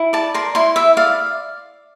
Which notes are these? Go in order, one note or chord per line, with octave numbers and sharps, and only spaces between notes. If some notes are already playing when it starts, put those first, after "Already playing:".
Already playing: E4
D5 A5
A#4 C6
E4 C6
E4 E5
D5 F5